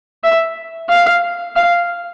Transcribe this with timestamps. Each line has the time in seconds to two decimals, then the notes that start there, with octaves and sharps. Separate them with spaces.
0.23 E5
0.89 F5
1.56 F5